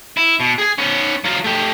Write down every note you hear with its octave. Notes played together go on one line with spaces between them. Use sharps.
E4
B2
G#4 G#5
B3 C#4
F#3 F4
A3 G4